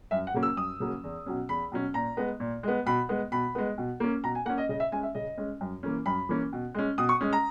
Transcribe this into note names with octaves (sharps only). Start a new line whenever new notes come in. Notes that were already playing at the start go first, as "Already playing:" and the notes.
F#2 E5
F#5
C#3 F#3 A#3 C#4
E6
F#2 D#6
C#3 F#3 A#3 C#4
E2
B2 F#3 C#4
E2 B5
B2 F#3 C#4
A#2 A#5
G#3 B3
A#2
G#3 B3
B2 B5
G#3 B3
B2 B5
G#3 B3
B2
A#3 C#4
B2 A#5
G#5
A#3 C#4 F#5
D#5
C#3 D#5
E5
G#3 C#4 G#5
E5
C#3 D#5
G#3 C#4
F#2
E3 A#3 C#4
F#2 B5
E3 A#3 C#4
B2
G#3 C#4
B2 D#6
C#6
G#3 C#4
A#5